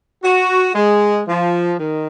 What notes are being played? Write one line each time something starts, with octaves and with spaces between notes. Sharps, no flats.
F#4
G#3
F3
D#3